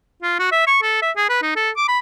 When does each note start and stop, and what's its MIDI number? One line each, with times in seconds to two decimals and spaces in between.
0.22 0.35 65
0.39 0.51 66
0.52 0.65 76
0.67 0.79 85
0.83 1.02 69
1.02 1.11 76
1.16 1.26 68
1.29 1.42 71
1.42 1.53 63
1.56 1.70 69
1.77 1.87 86
1.88 1.99 83